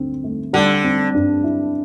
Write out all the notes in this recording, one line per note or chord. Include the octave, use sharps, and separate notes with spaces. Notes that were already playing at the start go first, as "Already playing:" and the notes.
Already playing: D2 D3 C4
A3
D3 G3
C4
G2
E4